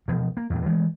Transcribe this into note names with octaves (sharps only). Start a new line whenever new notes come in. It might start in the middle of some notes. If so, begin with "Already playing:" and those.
E1 B2 F3
A#3
E2 A#2
E3 G#3 A3